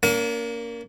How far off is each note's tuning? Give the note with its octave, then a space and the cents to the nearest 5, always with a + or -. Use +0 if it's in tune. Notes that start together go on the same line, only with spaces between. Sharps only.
A#3 +0 C#4 +45 F5 +30